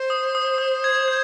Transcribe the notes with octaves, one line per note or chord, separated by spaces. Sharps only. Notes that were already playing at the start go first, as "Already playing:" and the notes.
Already playing: C5
D#6
D#6
D#6
G#6
G6